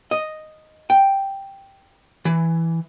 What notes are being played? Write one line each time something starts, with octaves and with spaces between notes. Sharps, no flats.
D#5
G5
E3